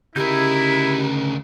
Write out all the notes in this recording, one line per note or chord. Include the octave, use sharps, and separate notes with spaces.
D2 C#3 D#4 E4 G4 A#4 G6